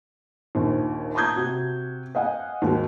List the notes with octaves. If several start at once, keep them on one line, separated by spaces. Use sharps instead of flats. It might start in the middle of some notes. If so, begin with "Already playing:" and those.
A#1 D#2
A5 A#5 D#6 G6 G#6
C3 F#4
D#5 F5 F#5 G#5
D#2 G#2 F#4